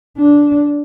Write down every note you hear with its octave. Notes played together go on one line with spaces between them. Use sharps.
D4